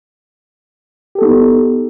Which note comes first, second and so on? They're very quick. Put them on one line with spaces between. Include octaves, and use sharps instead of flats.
G4 A4 B3 D#4